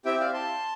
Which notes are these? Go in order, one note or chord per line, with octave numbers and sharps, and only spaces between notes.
C4 E4 G4 E5 G5
D5 F5
A5 C6